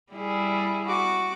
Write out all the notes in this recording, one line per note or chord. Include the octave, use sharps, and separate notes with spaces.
G3 E4 G#4
F#4 D6